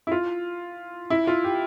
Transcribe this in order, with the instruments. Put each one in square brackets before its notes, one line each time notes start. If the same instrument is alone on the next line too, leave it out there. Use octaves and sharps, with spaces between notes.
[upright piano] E4
F4
E4
F4
G4